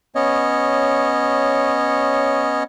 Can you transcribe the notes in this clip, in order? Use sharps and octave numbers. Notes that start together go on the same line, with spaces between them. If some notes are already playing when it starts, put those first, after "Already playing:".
B3 C#4 C#5 D#5